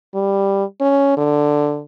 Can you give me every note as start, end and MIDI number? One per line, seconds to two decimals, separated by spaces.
0.14 0.64 55
0.81 1.14 61
1.17 1.83 50